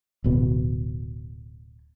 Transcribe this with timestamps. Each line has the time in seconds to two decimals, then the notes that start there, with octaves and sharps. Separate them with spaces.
0.24 D1 B2